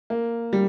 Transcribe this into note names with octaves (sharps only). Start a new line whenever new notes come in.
A#3
G3